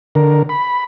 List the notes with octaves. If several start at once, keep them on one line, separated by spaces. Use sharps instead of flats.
D3 A#4
B5